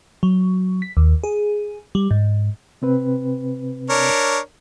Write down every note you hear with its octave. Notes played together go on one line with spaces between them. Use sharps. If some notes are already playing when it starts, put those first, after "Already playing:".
F#3
B6
D#2
G#4
G3
G#2
C3 C4 B4
D4 A#4 C#5